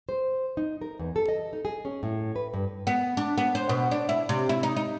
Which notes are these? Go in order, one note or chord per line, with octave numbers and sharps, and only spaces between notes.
C5
D#4
A#4
E2
A4
D#5
D#4
G#4
C#4
A2
B4
G2
B3
D4
B3
C5
B2
D4
E4
C3
E4
D#4
D#4